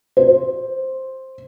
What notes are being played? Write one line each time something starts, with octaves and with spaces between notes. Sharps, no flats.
C5